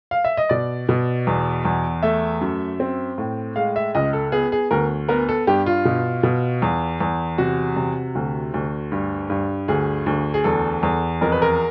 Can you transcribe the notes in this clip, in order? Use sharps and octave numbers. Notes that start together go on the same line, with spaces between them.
F5
E5
D#5
B2 D5
B2
E2
E2
A3 E5
F#2
C4
A2
G#3 F5
E5
C#2 D#5
A4
B3 G#4
G#4
D2 A#4
B3 A#4
A4
G2 G4
F4
B2
B2
E2
E2
C3 F#4
C3
D2
D2
G2
G2
D2 G#4
D2
G#4
E2 A4
E2
F2 A#4
B4
A#4